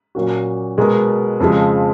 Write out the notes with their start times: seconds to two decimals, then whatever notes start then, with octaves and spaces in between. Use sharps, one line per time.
0.15 A#2 F#3 A#3 C#4 F#4
0.78 B2 G#3 B3 F#4 A#4
1.40 F2 C#3 F3 G#3